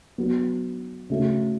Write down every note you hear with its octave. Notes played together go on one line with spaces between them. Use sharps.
F#3 B3 F#4
C#3 A3 F#4